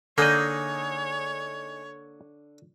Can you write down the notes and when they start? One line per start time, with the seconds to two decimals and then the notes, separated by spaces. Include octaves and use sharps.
0.18 D3 A#3 D#4 G#4 C#5 D#5